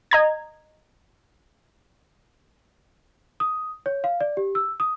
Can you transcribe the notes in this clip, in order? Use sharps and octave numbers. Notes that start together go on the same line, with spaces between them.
D#5 A#5 G#6
D#6
C#5
F5
D5
G4
E6
D#6